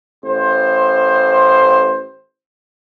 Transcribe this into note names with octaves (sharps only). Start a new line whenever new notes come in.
A1 C5